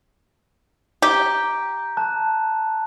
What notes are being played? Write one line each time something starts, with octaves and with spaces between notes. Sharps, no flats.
G4 A#5
A5 F#6